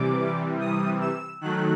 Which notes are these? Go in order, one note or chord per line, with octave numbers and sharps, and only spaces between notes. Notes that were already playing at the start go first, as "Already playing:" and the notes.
Already playing: C3 E3 G3 D6
D#6
E6
D#3 F#3 A3 F#6